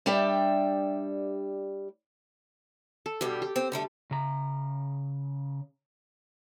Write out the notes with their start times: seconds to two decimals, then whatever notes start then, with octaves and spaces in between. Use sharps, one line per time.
0.06 G3 D4 G4 D5 E5
3.06 A4
3.21 G2 B2 G3 G4
3.42 G4
3.56 C4
3.72 D3 G3 A3
4.11 C#3 A#5